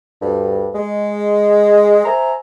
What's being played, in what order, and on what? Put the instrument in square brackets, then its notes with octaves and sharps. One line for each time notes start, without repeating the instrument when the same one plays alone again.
[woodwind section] D2 G2
G#3
C5 E5 G#5 A#5